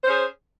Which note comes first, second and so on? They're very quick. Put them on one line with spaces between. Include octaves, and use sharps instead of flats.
C5 C#4 G#4